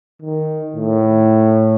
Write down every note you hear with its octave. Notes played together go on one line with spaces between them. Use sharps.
D#3
A2